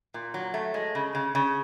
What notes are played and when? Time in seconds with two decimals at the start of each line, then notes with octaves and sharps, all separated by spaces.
0.14 A#2
0.34 F#3
0.54 A3
0.74 G#3
0.95 C#3
1.15 C#3
1.35 C#3